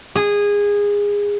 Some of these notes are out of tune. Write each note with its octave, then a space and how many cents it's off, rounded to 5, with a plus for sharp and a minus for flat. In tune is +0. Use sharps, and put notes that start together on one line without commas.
G#4 -20